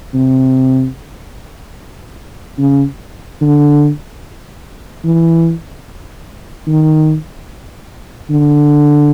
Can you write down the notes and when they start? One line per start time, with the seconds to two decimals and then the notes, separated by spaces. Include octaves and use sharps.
0.14 C3
2.59 C#3
3.41 D3
5.04 E3
6.67 D#3
8.30 D3